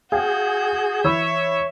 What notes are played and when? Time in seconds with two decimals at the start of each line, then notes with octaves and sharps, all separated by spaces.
0.12 F#4 G#4 F5 G5 G#5 G6
1.04 E3 C#5 E5 B5 E6